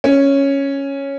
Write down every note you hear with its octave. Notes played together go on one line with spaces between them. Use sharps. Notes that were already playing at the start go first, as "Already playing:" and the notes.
C#4